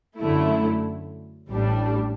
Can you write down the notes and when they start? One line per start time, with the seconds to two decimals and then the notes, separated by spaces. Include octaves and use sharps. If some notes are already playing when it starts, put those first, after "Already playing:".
0.19 F#2 D3 A3 E4
1.49 A1 A2 G3 D4